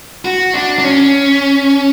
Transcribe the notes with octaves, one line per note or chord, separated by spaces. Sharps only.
F#4
D4
D4
C#4